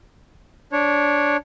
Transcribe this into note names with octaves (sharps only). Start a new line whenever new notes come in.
D4 C#5